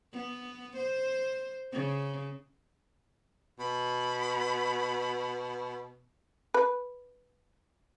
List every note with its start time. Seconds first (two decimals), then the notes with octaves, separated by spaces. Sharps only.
0.12 B3
0.77 C5
1.72 C#3
3.59 B2 B5
6.54 B4